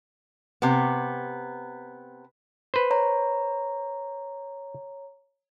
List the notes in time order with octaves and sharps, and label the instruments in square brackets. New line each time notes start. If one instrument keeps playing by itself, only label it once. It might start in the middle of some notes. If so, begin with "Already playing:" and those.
[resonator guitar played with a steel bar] C3 B3
[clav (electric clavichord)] B4 C5
[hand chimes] C#5 A#5